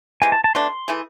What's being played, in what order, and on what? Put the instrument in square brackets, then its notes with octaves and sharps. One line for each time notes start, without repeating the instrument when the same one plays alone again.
[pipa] C3 E3 G#3 [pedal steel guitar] G#5
[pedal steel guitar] A5
A5
[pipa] B2 A3 D4 [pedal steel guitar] C6
[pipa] E3 A3 E4 G#4